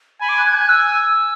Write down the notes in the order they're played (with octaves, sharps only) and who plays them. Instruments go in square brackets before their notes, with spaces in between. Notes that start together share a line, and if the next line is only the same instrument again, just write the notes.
[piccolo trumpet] G#5 [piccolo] B5
[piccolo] D6
F#6
G#6
[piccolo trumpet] G#5 [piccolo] F#6
[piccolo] E6
E6